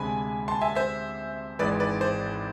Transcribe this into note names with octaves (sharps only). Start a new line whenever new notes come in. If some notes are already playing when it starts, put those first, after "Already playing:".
Already playing: D2 C3 G#3 D4 G#5 B5
A5 C6
E5 G#5
C5 E5
G#1 G#2 E3 G#3 B4 D5
B4 D5
C5